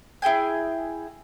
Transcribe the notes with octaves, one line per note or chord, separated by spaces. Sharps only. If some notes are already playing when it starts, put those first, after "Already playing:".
E4 G#4 G5 G#5